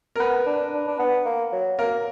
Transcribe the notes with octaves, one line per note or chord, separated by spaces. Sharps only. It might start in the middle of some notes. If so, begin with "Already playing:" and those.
A#4
B3 B4
D4
D4
D4
B3
A#3
F#3
A#3 A#4